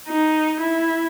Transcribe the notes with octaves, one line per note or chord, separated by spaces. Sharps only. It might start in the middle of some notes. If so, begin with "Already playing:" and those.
D#4
E4